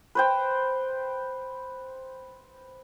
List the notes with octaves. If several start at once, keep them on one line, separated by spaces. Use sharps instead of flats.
B4 C5 G5